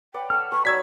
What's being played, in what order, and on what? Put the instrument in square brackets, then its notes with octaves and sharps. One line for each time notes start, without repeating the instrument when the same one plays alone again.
[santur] B4 D5 F#5 [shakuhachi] G5
[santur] A4 C#6 E6 [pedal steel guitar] F6
[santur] A4 B4 F#5 [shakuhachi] C#6
[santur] F#3 D#4 D#6 [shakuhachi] D5 [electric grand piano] E6 G#6 B6